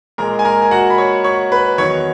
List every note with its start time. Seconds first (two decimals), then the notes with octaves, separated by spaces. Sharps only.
0.18 A#2 G#3 A#4 A#5
0.39 G#5
0.45 A#4 A#5
0.62 G#5
0.71 F#4 F#5
0.90 B5
0.98 C#5 C#6
1.24 C#5 C#6
1.52 B4 B5
1.78 E2 D#3 F#3 C#5 C#6